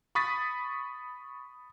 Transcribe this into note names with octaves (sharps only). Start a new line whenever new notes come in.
B5 C#6 D#6 A6 B6